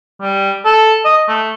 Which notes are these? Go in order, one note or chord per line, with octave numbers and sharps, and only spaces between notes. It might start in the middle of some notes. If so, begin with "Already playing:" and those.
G3
A4
D#5
A3